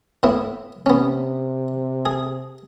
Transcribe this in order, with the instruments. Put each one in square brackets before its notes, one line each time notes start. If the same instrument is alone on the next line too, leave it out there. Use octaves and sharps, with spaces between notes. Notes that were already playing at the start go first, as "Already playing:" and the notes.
[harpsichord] A2 B3 E4
[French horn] C3 [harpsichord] B3 C#4
[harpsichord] G#4